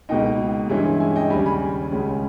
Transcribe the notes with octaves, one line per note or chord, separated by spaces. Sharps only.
C#2 B2 A#3 D#4 D#5 G5
G2 E3 G#3 C#4 E4
E5 G#5
D#5 G5
D#2 C#3 G3 G#5 B5
G#5 B5
C#2 C#3 G#3 C#4